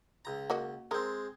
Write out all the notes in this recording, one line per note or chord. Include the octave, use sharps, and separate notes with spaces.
C#2 A#5
A#3 F#4 D#5
G#3 C4 A#4